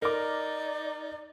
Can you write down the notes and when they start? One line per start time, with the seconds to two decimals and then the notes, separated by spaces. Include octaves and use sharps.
0.02 D#4 A#4 D5 D6